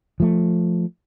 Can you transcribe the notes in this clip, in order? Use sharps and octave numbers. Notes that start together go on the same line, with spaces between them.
F3 A3